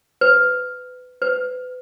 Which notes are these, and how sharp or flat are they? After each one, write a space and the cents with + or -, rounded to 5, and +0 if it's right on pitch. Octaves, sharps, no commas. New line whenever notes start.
B4 +25
B4 +35